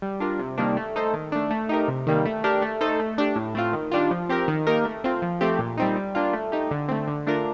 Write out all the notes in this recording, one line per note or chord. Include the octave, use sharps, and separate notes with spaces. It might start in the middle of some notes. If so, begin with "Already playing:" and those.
G3
D4 F4 A#4
C3
D#3 G3 A#3 D4
A3
D#4 A4 C5
D#3
A3 D4
A3
D#4 G4 A#4
C3
D#3 G3 A#3
A3
D4 G4 A#4
A3
D#4 A4 C5
A3
D4 G4
A2
A3 C4 F4
D#3
G3 D4 F4
F3
C4 G4 A#4
D#3
A#3 D#4 G4 A#4
A3
C4 F4
F3
A3 C4 G4
A#2
G3 C4 D#4
G3
A#3 D4 F4
A3
D#4 G4
D3
A3 C4
D3
A3 D4 F4 A#4